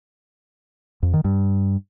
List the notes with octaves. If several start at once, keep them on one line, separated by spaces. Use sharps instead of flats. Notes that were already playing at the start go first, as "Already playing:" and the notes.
F2
D#3
G2